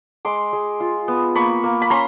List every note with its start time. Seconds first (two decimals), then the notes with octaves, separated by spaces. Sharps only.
0.25 G#3 C6 D6
0.53 G#3
0.80 F4
1.08 B3
1.35 A#3 B5 C#6
1.64 A#3
1.82 B5
1.90 C#4 A#5 C6